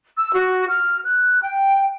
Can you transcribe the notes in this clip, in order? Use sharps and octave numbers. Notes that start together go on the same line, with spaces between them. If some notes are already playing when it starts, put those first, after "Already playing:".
E6
F#4
F6
F#6
G5